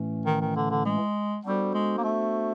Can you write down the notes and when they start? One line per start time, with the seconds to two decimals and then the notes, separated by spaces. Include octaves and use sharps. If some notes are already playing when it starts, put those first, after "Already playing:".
Already playing: A2 E3 A3 C#4
0.26 D#3
0.41 D#3
0.56 D3
0.70 D3
0.85 G#3
1.45 G3 B3 D4 F#4 A4 C5
1.74 G#3
1.97 A#3
2.04 A3